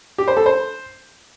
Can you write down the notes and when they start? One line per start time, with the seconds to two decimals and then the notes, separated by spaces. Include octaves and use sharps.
0.18 G4
0.28 C5
0.37 A4
0.46 C5